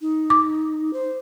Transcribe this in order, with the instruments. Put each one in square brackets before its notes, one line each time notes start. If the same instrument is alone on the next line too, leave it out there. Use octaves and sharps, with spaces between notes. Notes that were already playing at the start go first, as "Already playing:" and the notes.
[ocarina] D#4
[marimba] D6
[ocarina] C5